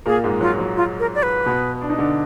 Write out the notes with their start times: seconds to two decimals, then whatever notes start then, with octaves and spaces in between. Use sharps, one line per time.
0.06 A#2 A#3 G#4
0.24 G#2 G#3
0.41 F#3 F4
0.59 F#3
0.77 F4
1.00 A#4
1.15 D5
1.23 B4
1.46 B2 B3
1.81 D4
1.90 D#4
1.98 D3 D4